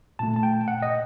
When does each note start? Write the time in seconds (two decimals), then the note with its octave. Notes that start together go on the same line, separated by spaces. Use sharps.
0.19 A#2 A3 A5
0.36 A5
0.43 G5
0.68 F#5
0.82 D#5